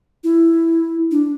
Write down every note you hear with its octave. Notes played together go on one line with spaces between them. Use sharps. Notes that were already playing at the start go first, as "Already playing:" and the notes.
E4
D4